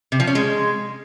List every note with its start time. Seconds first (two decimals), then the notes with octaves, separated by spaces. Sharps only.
0.12 C3
0.20 F3
0.27 C#4
0.35 G#3